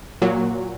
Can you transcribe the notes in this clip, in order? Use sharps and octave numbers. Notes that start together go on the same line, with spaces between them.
A#2 F#3